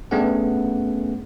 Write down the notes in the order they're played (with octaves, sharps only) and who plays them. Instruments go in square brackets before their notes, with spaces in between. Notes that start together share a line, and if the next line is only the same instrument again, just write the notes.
[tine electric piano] G2 A3 B3 C#4 G#4 F#5